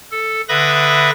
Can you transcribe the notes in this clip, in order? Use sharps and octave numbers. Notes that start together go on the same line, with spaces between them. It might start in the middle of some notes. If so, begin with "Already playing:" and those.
A4
D3 B4 E5 B5 D#6 A#6